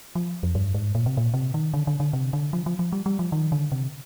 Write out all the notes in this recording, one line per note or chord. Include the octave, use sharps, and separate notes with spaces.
F3
F2
G2
G#2
A#2
C3
A#2
C3
D#3
D3
D3
D3
C3
D3
F3
F3
F3
G3
G3
F3
D#3
D3
C3